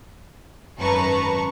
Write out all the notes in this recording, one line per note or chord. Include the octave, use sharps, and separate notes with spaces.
G#1 F#2 B4 A5 A#5 C#6